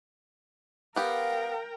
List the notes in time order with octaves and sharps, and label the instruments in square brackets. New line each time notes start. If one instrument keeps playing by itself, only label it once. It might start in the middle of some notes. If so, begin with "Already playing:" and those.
[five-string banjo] B3 G4 [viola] A#4 G5 [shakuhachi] F5